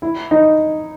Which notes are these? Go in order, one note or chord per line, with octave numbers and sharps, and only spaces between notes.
E4
D#4